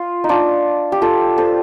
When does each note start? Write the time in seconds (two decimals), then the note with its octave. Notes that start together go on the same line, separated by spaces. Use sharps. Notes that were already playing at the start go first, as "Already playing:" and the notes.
Already playing: F4
0.24 D#4
0.29 D4 F4
0.92 G4
1.02 F4 A4
1.38 A4 C5